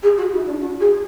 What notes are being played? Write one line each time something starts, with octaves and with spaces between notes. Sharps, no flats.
G#4
F#4
E4
D4
F#4
G#4